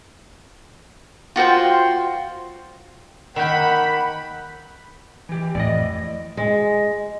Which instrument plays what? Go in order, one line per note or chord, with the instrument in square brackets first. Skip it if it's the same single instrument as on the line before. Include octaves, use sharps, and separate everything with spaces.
[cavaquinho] F4 F#4 C5 G5
[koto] D#3 A#3 [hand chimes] A#4 G6 [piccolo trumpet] F#5 [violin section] B5
[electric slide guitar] E3 G4
[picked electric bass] F2 A2 E3 [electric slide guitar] D5 D#5
[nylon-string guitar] G#3